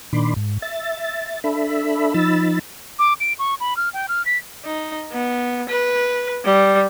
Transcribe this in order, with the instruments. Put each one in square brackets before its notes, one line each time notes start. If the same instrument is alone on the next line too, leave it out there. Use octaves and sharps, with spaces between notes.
[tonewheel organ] A#2 D#3 D4 B5 C6 D6
G#2
E5 A6
D4 A4 E5 B5
F3 D#4 B5 E6 A6
[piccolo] D6
D7
C#6
B5
F6
G5
F6
B6
[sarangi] D#4
B3
B4
G3